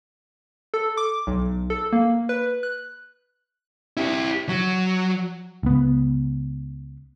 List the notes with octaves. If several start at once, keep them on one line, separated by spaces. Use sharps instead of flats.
A4
D6
B1
A4
A#3
B4
F#6
E4 G4
F#3
C#2 B3